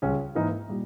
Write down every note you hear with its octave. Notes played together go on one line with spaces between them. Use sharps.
C#2 C#3 G3 C#4 G#4
G#2 E3 A#3 D#4
A#2 G3